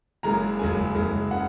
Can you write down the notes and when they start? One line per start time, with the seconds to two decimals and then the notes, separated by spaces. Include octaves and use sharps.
0.23 F#1 F#2 C#3 G#3 A#5
0.59 F#1 F#2 C#3 G#3 G#5
0.95 F#1 F#2 C#3 G#3
1.31 C#3 F#5